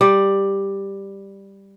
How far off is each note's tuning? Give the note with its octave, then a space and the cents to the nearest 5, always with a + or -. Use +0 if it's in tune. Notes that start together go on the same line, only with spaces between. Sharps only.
G3 +5 D5 +10